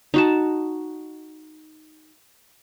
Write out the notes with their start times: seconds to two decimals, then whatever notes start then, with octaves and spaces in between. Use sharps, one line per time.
0.14 D#4 F#4 A5